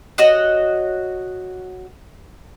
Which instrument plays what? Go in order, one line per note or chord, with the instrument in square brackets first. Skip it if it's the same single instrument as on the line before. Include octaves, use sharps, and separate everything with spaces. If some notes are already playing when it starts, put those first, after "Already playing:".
[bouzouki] F#4 C#5 D#5 F#5